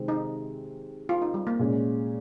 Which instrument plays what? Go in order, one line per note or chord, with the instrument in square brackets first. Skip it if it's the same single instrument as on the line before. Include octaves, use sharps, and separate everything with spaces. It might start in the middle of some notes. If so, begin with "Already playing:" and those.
Already playing: [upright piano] C3 D#3 G#3 C4
[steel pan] D#4
F4
D#4
G3
A#3
[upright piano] A#2 G#3 C#4